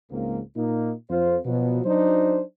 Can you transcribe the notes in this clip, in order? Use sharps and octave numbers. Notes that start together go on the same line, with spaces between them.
C#2 G#2 A#3 C4
A#2 A#3 D#4
F2 F4 C5
B2 F3 F#3 B3
F#3 D4 D#4 C5